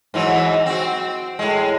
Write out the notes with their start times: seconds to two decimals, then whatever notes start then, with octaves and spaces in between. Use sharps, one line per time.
0.14 G#2 E3 F#3
0.66 C4 F#4
1.39 A2 G#3